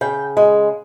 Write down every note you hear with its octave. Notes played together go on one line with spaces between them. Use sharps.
C#3 G5
G#3